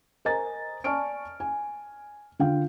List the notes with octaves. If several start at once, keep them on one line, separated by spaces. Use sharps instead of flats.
A#4 C5 D#5 G#5 A#5 A6
D5 G#5 A5 C#6 F6 D7
G#5
D3 F4 F5 G5